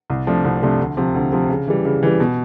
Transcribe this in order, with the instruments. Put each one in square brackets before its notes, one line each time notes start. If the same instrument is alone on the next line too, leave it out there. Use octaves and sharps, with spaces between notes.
[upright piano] C2
C3 F3 A3 D4
C2
C3 F3 A3 D4
D2
C3 F3
D2
C3 F3
C#3
E3 G3
C#3
E3 G3
B2